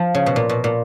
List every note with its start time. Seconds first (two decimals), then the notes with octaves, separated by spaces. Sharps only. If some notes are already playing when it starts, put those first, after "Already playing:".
Already playing: F3
0.14 C#3
0.26 B2
0.36 A#2
0.49 B2
0.64 A#2